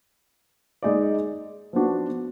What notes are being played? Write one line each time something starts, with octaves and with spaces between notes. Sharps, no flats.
G#3 D#4 G#4 D5
F3 B3 D4 F#4